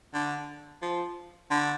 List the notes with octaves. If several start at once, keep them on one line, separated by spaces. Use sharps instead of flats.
D3
F3
D3